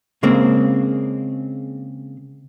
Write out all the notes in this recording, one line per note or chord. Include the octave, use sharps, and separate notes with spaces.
C#3 G#3 A#3 C4